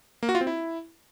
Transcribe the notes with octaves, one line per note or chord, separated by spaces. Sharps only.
A#3
F#4
F4
C4
E4